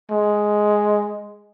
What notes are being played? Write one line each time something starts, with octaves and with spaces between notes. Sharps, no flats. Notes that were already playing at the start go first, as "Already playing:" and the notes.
G#3